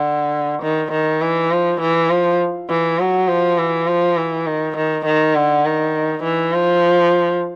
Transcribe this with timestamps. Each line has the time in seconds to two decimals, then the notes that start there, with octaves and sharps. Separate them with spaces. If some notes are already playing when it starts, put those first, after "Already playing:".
Already playing: D3
0.63 D#3
0.92 D#3
1.22 E3
1.51 F3
1.81 E3
2.10 F3
2.70 E3
2.99 F#3
3.28 F3
3.58 E3
3.87 F3
4.17 E3
4.47 D#3
4.77 D#3
5.06 D#3
5.35 D3
5.65 D#3
6.24 E3
6.53 F3